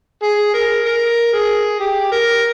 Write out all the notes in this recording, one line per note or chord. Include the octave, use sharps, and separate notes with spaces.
G#4
A#4
A#4
G#4
G4
A#4